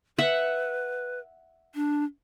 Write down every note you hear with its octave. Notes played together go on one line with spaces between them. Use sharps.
B4 E5 F#5
D4